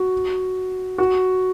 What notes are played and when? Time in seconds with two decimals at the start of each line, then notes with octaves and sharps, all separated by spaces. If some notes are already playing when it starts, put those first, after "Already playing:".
Already playing: F#4
0.98 F#4